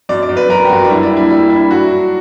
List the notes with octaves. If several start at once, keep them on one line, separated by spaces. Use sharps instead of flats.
F#2 D5
D5
F#2
B4
F#2 A#4
G4
F#2 F#4
D4
G3 E4
D4
A#3
E4
G3 E4
D4 E4
F#3 F#4
F#3